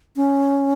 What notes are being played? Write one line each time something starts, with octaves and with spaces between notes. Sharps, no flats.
C#4